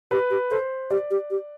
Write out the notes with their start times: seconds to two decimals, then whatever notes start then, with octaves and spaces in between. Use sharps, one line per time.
0.11 G4 B4
0.30 G4
0.51 A4 C5
0.91 G4 D5
1.11 G4
1.30 G4